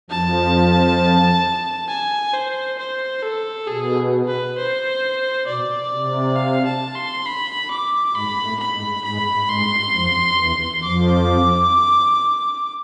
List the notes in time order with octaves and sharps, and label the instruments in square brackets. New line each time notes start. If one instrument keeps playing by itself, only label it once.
[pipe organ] F2 F3 [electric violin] A5
[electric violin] G#5
C5
C5
A4
[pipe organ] B2 [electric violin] G#4
[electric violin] B4
C5
[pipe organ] B2 [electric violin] D5
[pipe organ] C3
[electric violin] F5
A5
C6
B5
D6
[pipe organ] G#2 G#3 [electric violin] B5
[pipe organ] A2 A3
[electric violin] B5
[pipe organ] G#2 G#3
[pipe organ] G#2 G#3 [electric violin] B5
[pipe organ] G#2 G#3 [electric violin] C6
[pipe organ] F2 F3
E2 E3
[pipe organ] F2 F3 [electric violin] D6